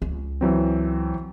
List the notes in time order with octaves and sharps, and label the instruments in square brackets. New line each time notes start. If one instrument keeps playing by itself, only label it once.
[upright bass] C#2
[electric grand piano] E3 F#3 C4